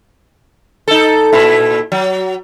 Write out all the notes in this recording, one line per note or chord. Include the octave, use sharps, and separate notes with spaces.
D#4 A4
A#2 E4
F#3